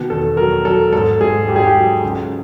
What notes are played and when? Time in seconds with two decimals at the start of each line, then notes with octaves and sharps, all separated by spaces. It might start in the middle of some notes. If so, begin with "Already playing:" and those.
Already playing: B2 D#3
0.10 E2 A4
0.37 F#3 A#4
0.65 F#3 A4
0.93 G#2 A4
1.20 G#2 G#4
1.48 G#2 G4
1.56 G#4
1.64 G4
1.75 F#3
2.03 C#2